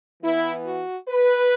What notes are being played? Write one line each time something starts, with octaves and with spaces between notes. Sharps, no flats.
E3 B3 E4
F#4
B4